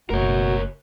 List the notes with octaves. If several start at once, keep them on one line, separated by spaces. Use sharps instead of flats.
F#1 B2 A3 F#4 A#4 C#5